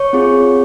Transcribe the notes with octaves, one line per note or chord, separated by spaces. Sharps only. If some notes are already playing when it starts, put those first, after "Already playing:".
Already playing: C#5 C#6
C4 F4 G#4